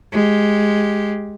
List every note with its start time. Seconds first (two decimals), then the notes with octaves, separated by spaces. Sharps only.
0.12 G#3 G4